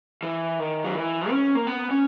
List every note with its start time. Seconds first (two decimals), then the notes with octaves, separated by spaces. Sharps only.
0.23 E3
0.59 D#3
0.84 F#3
0.95 E3
1.30 C#4
1.55 A#3
1.67 B3
1.91 C#4